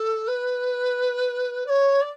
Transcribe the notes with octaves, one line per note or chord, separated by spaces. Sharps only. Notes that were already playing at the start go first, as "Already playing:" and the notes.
Already playing: A4
B4
D5
C#5
D5